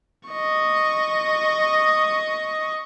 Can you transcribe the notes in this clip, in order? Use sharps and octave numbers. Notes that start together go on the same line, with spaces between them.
D#5 C#6